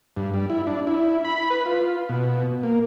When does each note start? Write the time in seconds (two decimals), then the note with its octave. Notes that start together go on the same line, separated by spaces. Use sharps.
0.17 G2
0.34 G3
0.50 E4
0.67 D4
0.87 E4
1.25 B5
1.50 B4
1.66 F4
2.09 B2
2.63 A#3